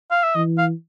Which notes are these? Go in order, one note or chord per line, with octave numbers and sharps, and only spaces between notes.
F5
E5
E3 D#5
F5